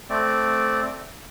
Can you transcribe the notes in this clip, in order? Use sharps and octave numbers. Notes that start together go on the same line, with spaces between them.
A3 C4 D5